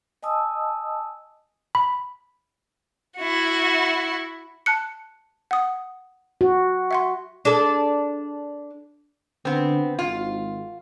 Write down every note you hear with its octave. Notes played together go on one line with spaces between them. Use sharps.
D#5 G#5 A5 D#6 E6
B5
E4 F#4
A5 F#6 C#7
F#5 D#6
F#4
E5 F#5 C6
D4 G#4 A4
D3 B3 C4
G#1 F4